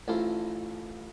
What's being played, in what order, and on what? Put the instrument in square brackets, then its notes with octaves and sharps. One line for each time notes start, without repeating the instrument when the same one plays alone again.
[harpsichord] A1 A3 E4 F4 C5